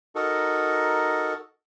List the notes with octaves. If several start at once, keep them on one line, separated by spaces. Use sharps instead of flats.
D#4 F#4 A4 A#4